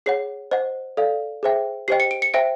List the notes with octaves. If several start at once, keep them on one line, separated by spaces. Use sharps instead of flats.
G#4 C#5 F#5 C7
C5 D#5 F#5
A4 D5 F5
G#4 C5 E5 G5
G4 C5 D#5 G5 C7
C#7
D7
C#7
C5 E5 G5 D7